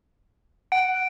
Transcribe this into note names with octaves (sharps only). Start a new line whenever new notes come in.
F#5 D7